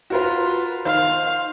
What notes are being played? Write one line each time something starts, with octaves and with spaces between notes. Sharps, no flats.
F4 F#4 A#4 B4
D#3 C5 F5